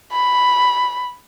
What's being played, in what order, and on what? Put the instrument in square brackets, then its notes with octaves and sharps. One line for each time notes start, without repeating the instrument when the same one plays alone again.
[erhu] B5